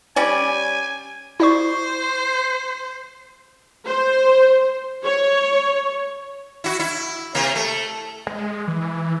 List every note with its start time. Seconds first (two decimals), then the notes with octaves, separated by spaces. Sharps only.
0.16 G3 C#4 D5 G#5
1.40 E4 C5 D5 C#6
3.86 C5
5.03 C#5
6.64 E4 F#4
6.79 E4
7.35 C3 A#3
7.55 A3
8.27 G#3
8.68 E3